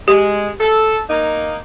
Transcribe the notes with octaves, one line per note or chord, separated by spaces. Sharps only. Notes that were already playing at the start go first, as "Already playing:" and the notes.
G#3 G4
A4
A#3 D#4